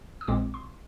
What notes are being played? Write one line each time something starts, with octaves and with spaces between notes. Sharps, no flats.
D#6
A#1 A#2 G#3 C4 D6
C6